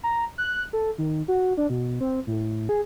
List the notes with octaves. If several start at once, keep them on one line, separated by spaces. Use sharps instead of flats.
A#5
F#6
A4
D#3
F#4
D4
B2
C4
A2
G#4